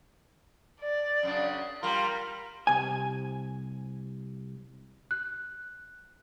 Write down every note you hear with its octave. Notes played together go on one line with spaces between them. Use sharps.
D5
F#2 C#3 D4
G3 F4 A#4 C6
C2 G#5
F#6